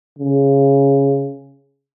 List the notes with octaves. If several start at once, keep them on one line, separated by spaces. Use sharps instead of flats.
C#3